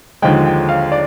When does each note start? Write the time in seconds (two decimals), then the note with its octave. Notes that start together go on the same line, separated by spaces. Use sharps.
0.22 D#2 D3 F3 G#3 G5
0.45 G5
0.69 F5
0.92 D5